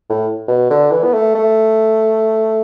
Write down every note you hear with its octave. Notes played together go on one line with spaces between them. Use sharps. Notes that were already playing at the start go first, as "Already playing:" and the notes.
A2
B2
D3
E3
B3
A3
A3